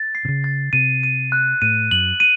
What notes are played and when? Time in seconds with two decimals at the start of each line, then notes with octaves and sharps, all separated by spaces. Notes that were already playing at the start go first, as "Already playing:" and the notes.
Already playing: A6
0.15 C7
0.25 C3
0.28 C#3
0.44 A6
0.73 C3 D#7
1.03 D#7
1.32 F#6
1.62 A2 D#7
1.91 F#2 F#7
2.20 D#7